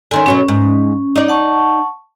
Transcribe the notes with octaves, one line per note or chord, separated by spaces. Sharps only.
D3 D#3 C#4 G#5 C6
B2 F#3 B3 C#4
G#2
D#4 D5
F#5 A5 C#6